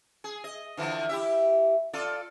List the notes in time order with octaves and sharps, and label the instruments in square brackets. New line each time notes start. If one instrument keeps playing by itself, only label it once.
[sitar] G#4
D#5
D3 E3 F3
E4 G4 E5
F4 A4 D5